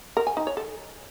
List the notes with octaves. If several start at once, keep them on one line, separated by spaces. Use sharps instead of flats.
A#4
G#5
D#4
C#5
A4